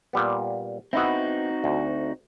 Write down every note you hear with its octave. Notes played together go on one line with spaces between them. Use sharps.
A#2 G3 B3
B3 C4 D#4 E4 F#4
D2